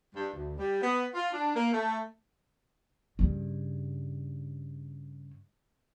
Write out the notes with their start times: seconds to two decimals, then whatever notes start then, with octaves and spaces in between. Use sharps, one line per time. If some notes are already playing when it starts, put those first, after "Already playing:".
0.14 G2
0.33 D2
0.58 G3
0.82 B3
1.14 F4
1.33 D4
1.54 A#3
1.73 A3
3.19 G2 C#3